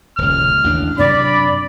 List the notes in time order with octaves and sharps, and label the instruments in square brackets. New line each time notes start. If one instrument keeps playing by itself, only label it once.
[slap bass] D#1 C#2 [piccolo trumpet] F6
[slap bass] A1 D#2 D4
[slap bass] F#2 C3 D4 [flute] D5 [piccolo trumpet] B5